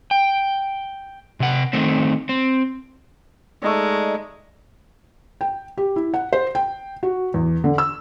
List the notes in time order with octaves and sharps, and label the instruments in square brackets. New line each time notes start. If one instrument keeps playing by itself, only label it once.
[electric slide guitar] G5
C3 F#5
D#3 A3 C4
C4
[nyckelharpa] G#3 [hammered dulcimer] A3 D#4 D5
[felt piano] G5
G4
E4
F#5
C5
G5
F#4
E2
D3
E6